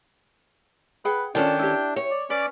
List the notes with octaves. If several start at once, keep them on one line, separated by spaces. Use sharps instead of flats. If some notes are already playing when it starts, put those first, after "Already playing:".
G#4 B4 F#5 G5
D#3 C#4 D4 F4 A4 D5 G5
E4 G4
C#5
D5
C#4 B4 D5 D6